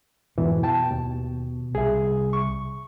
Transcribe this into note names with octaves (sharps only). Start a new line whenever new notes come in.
F2 G#2 B2 E3
G5 A5
D#2
C2 G#4 E5
C#6